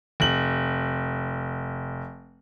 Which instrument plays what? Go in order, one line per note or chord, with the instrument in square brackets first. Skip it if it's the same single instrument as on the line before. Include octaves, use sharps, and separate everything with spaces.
[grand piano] F1 F#7